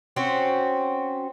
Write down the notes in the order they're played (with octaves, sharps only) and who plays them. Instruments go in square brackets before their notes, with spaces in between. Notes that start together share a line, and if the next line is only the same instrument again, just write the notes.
[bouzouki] C4 C#4 F#4